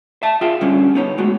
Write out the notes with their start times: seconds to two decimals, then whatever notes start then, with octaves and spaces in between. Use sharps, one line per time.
0.23 E5 A5
0.41 F4 G#4 E5 G5
0.61 D3 G3 C#4
0.95 B3 D#4 C#5
1.18 G#3 A3 F#4